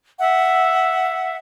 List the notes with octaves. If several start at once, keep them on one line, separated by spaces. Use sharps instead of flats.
E5 F#5